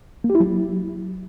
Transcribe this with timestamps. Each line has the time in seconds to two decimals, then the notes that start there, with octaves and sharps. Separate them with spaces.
0.24 A#3
0.30 G4
0.35 E4
0.40 F#3